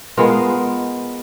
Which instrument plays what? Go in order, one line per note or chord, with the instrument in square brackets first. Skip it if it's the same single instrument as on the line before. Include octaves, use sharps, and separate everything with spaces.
[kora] G#3 B3 F4 A#4